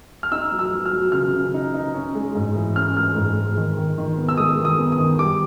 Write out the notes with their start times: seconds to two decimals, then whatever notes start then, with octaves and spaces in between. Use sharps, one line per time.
0.23 F6
0.32 D#4 E6
0.52 F#3
0.59 E6
0.72 F#3
0.86 F6
0.93 F#3
1.12 C#3 F6
1.33 C#3
1.54 D#4
1.74 D#4
1.94 C#4
2.15 G#3
2.35 G#2
2.55 E3
2.75 C#4 F6
2.96 G#3 F6
3.16 G#2
3.37 G#3
3.57 D#3
3.77 D#3
3.98 D#3
4.17 B3
4.29 E6
4.37 G#3 D#6
4.58 D#3
4.65 D#6
4.79 B3
4.92 D#6
4.99 D#3
5.19 G3 D6